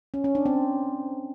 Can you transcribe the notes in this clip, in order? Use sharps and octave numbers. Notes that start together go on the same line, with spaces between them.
C#4
C#4
D4
C4